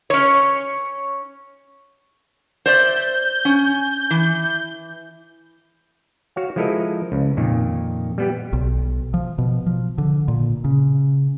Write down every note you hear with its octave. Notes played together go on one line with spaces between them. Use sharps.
C#4 C#5
C5 D5 E5 G6
C#4
E3
F#4 C#5 F5
F3 G#3 E4 A4 A#4 D#5
C#2
F2 A#2 D#3
G3 B3 G4
B1
F3
B2
F3
D3
A#2
C#3